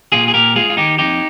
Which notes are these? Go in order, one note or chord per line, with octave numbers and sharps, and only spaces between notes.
A#2 F4 G#4
G#4
A#2 G4 A#4
G#3 F4 G#4
F4
D#3 D#4 G4
F2 D#4 G4